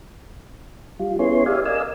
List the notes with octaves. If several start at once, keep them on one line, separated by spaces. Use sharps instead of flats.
G3 F4
B3 C#4 E4 G#4 C#5 C6
G4 D5 E5 F5 G#5
A#4 D5 D#5 F5 G#5 E6